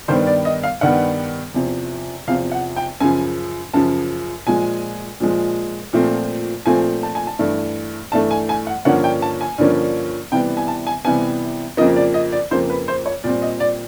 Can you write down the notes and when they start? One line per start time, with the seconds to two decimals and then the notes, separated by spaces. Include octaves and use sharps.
0.08 G2 D#3 G3 B3 C5
0.27 D5
0.45 D#5
0.63 F5
0.81 G2 D#3 G3 B3 F#5
1.54 E2 C3 F3
2.27 E2 C3 F3 F5
2.52 F#5
2.76 G5
3.00 F#2 C#3 F3 G#5
3.74 F#2 C#3 F3 A5
4.47 A#2 F3 G#3 G#5
5.20 A#2 F3 G#3
5.93 A#2 F3 A3 C4
6.66 A#2 F3 A3 C4 G#5
7.03 A5
7.15 G#5
7.27 A5
7.39 G2 E3 A3
8.12 G2 E3 A3 A5
8.31 G#5
8.49 G#5
8.67 F#5
8.85 G2 D3 F3 A#3 C#4 F#5
9.04 G5
9.22 A5
9.41 G#5
9.58 G2 D3 F3 A#3 C#4
10.32 C3 E3 G3 B3 G5
10.57 G#5
10.68 A5
10.87 G#5
11.05 C3 E3 G3 B3 G#5
11.77 F2 C#3 F3 A#3 D#5
11.96 D5
12.14 D#5
12.32 D5
12.51 F2 C#3 F3 A#3 C5
12.70 B4
12.88 C5
13.06 C#5
13.24 A#2 G3 C4 D5
13.42 D#5
13.60 D5